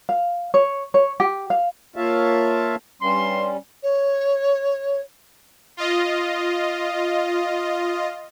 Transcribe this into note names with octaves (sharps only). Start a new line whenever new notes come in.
F5
C#5
C#5
G4
F5
A#3 F4 C#5 E5 F5 A5
G2 G3 C#4 C6
C#5
F4 D#5